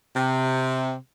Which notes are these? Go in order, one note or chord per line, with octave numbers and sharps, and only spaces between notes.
C3